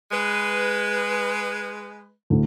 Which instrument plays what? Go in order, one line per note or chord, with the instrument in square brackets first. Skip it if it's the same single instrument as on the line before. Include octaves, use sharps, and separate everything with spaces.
[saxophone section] G#3 B4
[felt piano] D2 A2